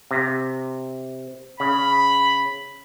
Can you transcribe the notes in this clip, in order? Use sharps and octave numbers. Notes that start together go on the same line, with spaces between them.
C3
C#3 B5